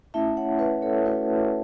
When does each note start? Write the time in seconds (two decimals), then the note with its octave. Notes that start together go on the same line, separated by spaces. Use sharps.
0.14 A3 C#4 E4 E5 A5
0.37 C#5 F#5
0.59 B4 E5
0.82 A4 C#5
1.06 A3 C#4 E4 F#4 B4